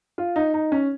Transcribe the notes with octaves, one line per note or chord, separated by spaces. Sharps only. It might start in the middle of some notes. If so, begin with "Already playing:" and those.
F4
D#4
D#4
C#4